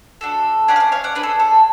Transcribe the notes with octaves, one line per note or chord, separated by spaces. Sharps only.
D4 F#4 A4
A3 C#4 G#4 D5 F#5
F5
D5 F#5
C#5 F5
D5 F#5
D4 G#4 B4
A4
A4